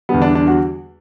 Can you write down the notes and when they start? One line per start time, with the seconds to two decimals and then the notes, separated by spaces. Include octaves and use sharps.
0.09 E2 D3 G3 B3
0.22 D4
0.35 D4
0.47 F#4